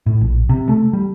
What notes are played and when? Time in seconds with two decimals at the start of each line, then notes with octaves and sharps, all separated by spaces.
0.06 A2
0.21 A#1
0.49 C3
0.69 A3
0.93 G3